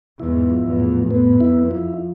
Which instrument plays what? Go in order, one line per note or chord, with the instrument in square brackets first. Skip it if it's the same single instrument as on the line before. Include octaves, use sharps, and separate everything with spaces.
[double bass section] E2 G#2 [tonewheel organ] E4
[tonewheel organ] F3
[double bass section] E2
[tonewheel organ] A2
[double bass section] F2 [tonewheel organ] B3
[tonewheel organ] E4
F3